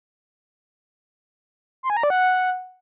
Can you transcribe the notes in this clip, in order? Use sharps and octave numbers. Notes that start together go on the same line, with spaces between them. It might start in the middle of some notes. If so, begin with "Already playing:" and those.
C6
G#5
A#5
D5
F#5